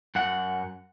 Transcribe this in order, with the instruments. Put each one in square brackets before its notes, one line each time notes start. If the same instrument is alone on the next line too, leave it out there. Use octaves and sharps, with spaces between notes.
[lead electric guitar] F#2 F#5